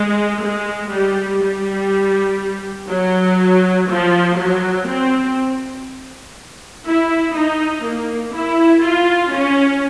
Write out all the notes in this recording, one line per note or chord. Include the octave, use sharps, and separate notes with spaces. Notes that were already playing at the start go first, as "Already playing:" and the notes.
Already playing: G#3
G#3
G3
G3
F#3
F3
F#3
C4
E4
D#4
A#3
E4
F4
C#4